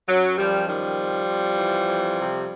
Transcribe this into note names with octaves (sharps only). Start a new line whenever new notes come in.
F#2 F#3
F#2 F3 G3
D#3 F3 G3
F2
F2
E3
F2
C3